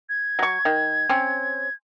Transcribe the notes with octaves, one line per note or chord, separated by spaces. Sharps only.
G#6
F#3 C#6
D#3
C4 C#4